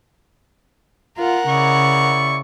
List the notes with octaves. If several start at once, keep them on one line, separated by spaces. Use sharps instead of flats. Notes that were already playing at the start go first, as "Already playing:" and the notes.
F4 A#4 F#5
C#3 E4 D5 C#6